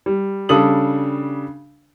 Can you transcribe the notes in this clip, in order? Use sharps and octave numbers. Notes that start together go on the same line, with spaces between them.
G3
C#3 G3 D4 A4 D#6 F#7